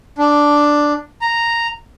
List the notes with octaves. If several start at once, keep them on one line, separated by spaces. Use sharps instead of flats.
D4
A#5